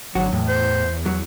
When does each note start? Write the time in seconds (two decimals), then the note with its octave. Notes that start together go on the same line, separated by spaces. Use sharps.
0.15 G#1 D3 F#3 F#4
0.33 E2 A2
0.48 C5
1.06 F#3